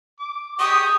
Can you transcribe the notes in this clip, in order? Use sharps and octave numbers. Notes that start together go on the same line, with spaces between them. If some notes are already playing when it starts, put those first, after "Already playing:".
D6
G4 G#4 C#6 D#6